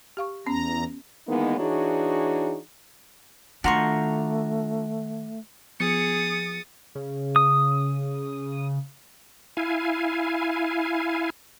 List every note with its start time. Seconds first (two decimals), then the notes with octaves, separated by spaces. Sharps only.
0.17 G4 F5 C#6
0.46 E2 B3 C#4 A#5
1.27 D#3 E3 G#3 A#3 B3 D#4
1.58 E3 D4 D#4 F#4 G#4 C#5
3.64 D#3 A3 D4 F4 F#4 A#5 C6 C#6
5.80 F3 B3 G#4 D#6 A6 C#7
6.95 C#3
7.36 D#6
9.57 E4 F5 G#5